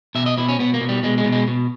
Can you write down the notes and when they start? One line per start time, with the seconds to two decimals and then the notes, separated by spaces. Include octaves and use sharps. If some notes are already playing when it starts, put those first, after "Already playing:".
0.15 B2 E5
0.26 D#5
0.38 B2 E4
0.49 C#4
0.59 B2 B3
0.74 A#3
0.81 B2
0.89 G3
1.03 B2 G#3
1.18 G#3
1.25 B2
1.33 G#3
1.48 B2